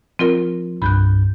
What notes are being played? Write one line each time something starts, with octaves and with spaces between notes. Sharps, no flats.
F3 C4 F4 A#4
C2 G2 B5 F#6 G6